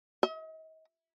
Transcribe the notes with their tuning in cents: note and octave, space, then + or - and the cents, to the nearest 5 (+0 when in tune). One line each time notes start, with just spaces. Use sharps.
D#5 +40